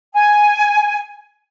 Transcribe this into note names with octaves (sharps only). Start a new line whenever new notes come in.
G#5